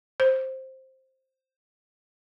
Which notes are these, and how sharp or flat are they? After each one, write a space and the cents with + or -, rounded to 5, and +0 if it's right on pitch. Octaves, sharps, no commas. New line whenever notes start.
C5 +10